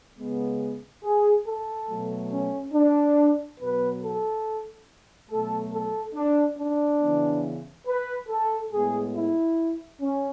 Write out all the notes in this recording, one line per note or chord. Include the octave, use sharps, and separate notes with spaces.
C#3 G#3 B3
G#4
A4
B2 F#3 A3
C#4
D4
B2 F#3 B3 B4
A4
B2 F#3 A3 A4
A4
D4
D4
C#3 E3 B3
B4
A4
A2 G#3 B3 G#4
E4
C#4